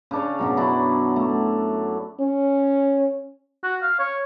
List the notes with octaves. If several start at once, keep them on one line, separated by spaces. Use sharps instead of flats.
C#3 D4 C#5
F#2 B2 F#3
F#3 D4 E4
A3
C#4
F#4
F5
C#5